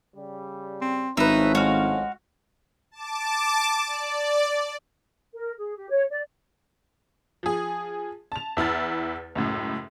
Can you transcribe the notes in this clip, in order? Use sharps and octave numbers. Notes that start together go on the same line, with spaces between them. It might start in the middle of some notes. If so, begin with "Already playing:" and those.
C#3 G3
C4
G#1 A2 F3 C#4 D#4 B4 E5
G#3 F#4 F5
A5 D6
D5
A#4
G#4
G4
C#5
D5
F3 G#4
A5 F7
E2 E4 F6 A6
C#2 F#2 A2